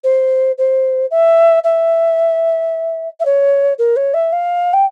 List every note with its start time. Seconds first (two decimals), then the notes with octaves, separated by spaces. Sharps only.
0.04 C5
0.58 C5
1.11 E5
1.64 E5
3.20 E5
3.25 C#5
3.78 A#4
3.96 C#5
4.14 E5
4.32 F5
4.73 G5